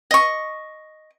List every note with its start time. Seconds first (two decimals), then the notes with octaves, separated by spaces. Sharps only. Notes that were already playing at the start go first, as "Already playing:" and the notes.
0.11 D#5 C#6